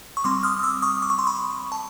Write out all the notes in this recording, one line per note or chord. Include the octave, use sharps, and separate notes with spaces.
C#6
G3 C4 C6 D6
D#6 F6
D#6
D6 E6
C#6 D#6
D6
C#6
C6
B5 C#6
A5